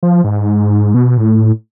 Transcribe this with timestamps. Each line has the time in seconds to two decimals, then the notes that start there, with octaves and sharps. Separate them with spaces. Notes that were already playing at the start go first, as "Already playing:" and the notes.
0.03 F3
0.24 G#2
0.94 B2
1.17 A2